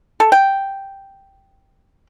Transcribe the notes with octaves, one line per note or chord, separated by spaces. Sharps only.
A4
G5